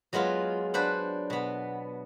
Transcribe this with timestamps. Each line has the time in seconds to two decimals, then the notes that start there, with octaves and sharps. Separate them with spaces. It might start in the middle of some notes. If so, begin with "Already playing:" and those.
0.13 F#3 G#3 B3 F4
0.74 D4 B4 C5 F#5
1.30 B2 B3